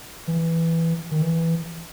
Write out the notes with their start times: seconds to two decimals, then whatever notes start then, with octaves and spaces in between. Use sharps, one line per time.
0.28 E3
1.11 D#3
1.22 E3